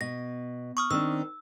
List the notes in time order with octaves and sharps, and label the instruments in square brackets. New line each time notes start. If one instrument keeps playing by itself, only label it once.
[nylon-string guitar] B2 [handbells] A#6
[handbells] C#6 D#6 F6
[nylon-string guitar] D#3 C4 D4 [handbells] E6